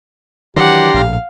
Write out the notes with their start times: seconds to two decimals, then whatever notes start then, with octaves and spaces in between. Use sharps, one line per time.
0.56 D#3 E3 F#3 D4 G4 F#5 A#5 C6
0.94 A#1 A2 F5